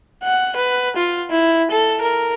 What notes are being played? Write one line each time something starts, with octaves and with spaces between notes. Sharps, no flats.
F#5
B4
F4
E4
A4
A#4